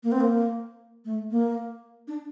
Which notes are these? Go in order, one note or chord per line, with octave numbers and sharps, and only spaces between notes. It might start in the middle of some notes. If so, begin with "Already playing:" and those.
A#3
C4
A#3
A3
A#3
D4